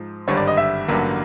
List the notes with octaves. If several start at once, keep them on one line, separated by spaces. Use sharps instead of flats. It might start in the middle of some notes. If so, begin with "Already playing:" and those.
Already playing: G#2 F3
G#1 G2 D3 G3 C#5
D5
D#5
E5
A1 G2 D3 F#3 A#3